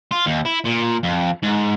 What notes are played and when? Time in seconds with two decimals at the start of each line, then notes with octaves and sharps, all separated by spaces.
0.11 F4
0.26 D#2
0.45 E4
0.65 A#2
1.03 F2
1.43 G#2